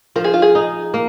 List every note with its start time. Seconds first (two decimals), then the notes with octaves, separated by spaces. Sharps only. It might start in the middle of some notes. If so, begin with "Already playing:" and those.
0.16 F3 A#4
0.24 G#4
0.34 F4
0.42 G#4
0.55 D#4
0.94 A#3